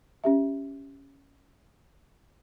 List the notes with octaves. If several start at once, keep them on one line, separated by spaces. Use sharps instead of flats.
C#4 G4 E5